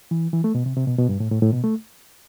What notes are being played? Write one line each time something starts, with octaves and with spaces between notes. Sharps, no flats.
E3
E3
A3
B2
C3
C3
B2
B2
G2
A2
A2
A2
B2
A3